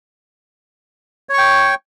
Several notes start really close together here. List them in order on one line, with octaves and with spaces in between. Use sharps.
C#5 C#6 G5